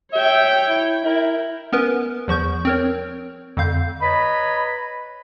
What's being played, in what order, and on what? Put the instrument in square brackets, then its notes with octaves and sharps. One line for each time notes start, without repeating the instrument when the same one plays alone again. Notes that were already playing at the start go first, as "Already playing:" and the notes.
[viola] C#5 G5 [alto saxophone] E5
[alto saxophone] E4
[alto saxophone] E4 [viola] A#4
[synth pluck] B3 C#4 A#4 B4
E2 F3 C#6 G6
C4 A#4 C#5
F2 D3 F5 G6
[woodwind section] B4 C#5 D#5 A#5 B5